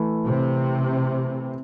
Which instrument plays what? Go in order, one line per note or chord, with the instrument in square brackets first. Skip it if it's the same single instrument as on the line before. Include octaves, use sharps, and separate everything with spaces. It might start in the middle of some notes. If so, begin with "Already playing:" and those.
Already playing: [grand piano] E3 A3 E4
[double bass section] C3